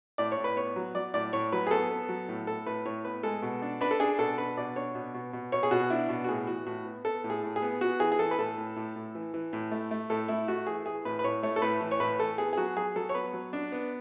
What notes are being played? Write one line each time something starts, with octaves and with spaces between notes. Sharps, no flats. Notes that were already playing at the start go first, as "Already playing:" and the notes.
A2 D5
C#5
A2
B4
B3 C#5
F#3
F#3 D5
A2 D5
A2 C#5
F#3 B4
G#4
B3 A4
B3
F#3
A2
A2 A4
A2 B4
A2 C#5
B3 B4
G#3 A4
B2
D4
D4 B4
A4
D4 G#4
B2 A4
D4 B4
B2 D5
D4 C#5
B2
B2
B2
B2 C#5
G#4
B2 F#4
D4 E4
B2
F#4
A2 G#4
E3 F#4
A2 F#4
B3
B3 A4
A2
G#4
A2
G#4
B3
B3 F#4
E3 G#4
G#4
E3 A4
B4
A2 A4
A2
A2
A2
E3
E3
A2
A3
A3
A2 A4
A3 E4
A3 F#4
E3 G#4
E3 G#4
A2 B4
B4
A2 C#5
A3 C#5
A4
A2 B4
E3
C#5
A2 B4
E3 A4
B3 G#4
G#4
F#3 F#4
F#3 G#4
F#3 A4
C#5
B3 B4
F#3
D4
B3